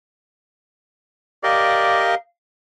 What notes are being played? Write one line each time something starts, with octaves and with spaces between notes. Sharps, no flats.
G4 A#4 D5 D#5 F5